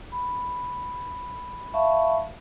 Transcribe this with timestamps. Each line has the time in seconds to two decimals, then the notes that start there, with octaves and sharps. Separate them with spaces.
0.12 B5
1.74 E5 F5 A5 B5 C#6